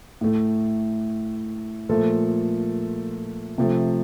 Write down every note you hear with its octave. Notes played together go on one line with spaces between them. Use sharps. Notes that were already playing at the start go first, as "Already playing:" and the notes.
A2 A3
A#2 F3 A3 A4
C3 F3 A3